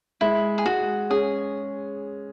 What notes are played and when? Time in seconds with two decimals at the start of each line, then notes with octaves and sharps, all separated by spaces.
0.21 G#3 E4
0.58 G#4
0.65 G#3 F#4
1.10 C#4 G#4